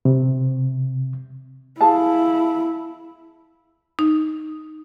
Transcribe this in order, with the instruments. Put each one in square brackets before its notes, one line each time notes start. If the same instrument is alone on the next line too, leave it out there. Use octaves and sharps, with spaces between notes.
[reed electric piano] C3
[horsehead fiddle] E4 [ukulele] G#4 F5 A5
[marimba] D#4